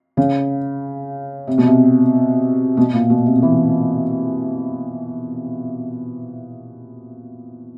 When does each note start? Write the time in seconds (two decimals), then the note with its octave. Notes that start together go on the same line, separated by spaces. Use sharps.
0.17 C#3
1.47 C3
1.58 B2
1.67 C3
2.77 B2
2.93 A#2
3.10 B2
3.26 C3
3.42 E3